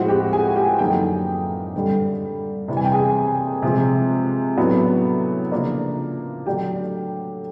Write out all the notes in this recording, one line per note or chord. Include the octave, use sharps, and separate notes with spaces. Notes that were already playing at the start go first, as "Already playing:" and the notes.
Already playing: A2 F3 G#3 C4 F#4 F#5
G4 G5
G#4 G#5
G4 G5
F#2 D3 F3 A#3 D#4 G4 G5
G2 D3 G3
C3 E3 G3
G#5
G5
G#4 G#5
C3 F3 G#3
A2 F#3 B3 D4
C#3 F3 A#3 D4
D3 F#3 A3 D4 G4 G5